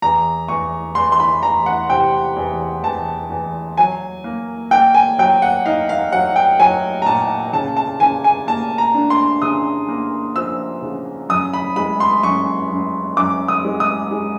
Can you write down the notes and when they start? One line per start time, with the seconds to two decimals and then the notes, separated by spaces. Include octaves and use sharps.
0.02 E2 A#5
0.48 E2 C#6
0.95 E2 C6
1.12 C6
1.20 B5
1.43 E2 A#5
1.66 F#5
1.90 C3 G5
2.37 E2
2.83 E2 A5
3.30 E2
3.78 F#3 G#5
4.24 A#3
4.71 A#3 G5
4.95 G#5
5.19 F#3 G5
5.42 F#5
5.65 D#4 F5
5.89 F5
6.12 F#3 F#5
6.36 G5
6.60 F#3 G#5
7.02 A#5
7.06 A#2 A5
7.53 C#3 A5
7.77 A5
8.00 C#3 G#5
8.24 G#5
8.47 A#3 A5
8.78 A#5
8.95 D4
9.10 C6
9.42 C#3 D#6
9.88 A#3
10.35 F3 E6
10.82 C#3
11.29 F#2 D#6
11.54 B5
11.76 G#3 B5
12.00 C6
12.23 F#2 C#6
12.71 F#2
13.17 F#2 D6
13.48 D#6
13.65 G#3
13.80 D#6
14.11 G#3